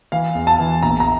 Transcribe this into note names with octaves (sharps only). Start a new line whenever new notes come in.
E3 F5
E2
A5
E3
A#1 A#5
A#5